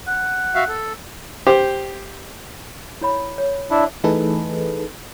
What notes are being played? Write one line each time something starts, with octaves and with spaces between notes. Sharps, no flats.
F#5
F#4 E5 F5
A4
G4 C5
E4 C#5 B5
C#5
D4 E4
E3 A3 D#4 G#4 A4 B4